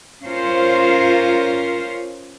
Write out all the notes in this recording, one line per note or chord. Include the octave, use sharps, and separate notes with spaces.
C#4 F4 A#4 C5